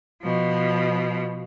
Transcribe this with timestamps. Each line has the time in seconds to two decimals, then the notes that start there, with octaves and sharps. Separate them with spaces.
0.22 B2 F3